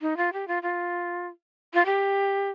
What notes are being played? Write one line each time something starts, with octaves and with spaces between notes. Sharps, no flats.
D#4
F4
G4
F4
F4
F4
G4